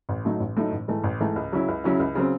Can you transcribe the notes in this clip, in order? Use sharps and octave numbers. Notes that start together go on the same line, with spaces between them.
A1
A2 F#3 A3 D#4
A1
A2 F#3 A3 D#4
A1
G#2 E3 A3
A1
G#2 E3 A3
C#2
C#3 F#3 C#4 E4
C#2
C#3 F#3 C#4 E4
C#2
C#3 F#3 C4